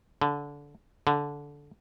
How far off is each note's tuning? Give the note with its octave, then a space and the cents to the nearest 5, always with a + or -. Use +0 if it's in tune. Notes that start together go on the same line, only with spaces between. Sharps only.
D3 -20
D3 -15